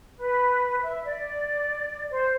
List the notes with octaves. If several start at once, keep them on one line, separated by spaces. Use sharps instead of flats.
B4
E5
D5
C5